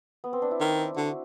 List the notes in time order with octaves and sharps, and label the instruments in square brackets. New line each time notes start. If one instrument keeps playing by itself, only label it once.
[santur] B3
C4
D4
E4
[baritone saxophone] D#3
[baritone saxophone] D3 [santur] F#4